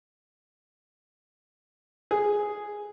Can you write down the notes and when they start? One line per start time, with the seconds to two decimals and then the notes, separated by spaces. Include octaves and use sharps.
2.11 G#4